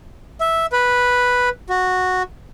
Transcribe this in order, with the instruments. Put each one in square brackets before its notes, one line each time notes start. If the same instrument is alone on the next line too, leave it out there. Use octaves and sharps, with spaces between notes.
[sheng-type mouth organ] E5
B4
F#4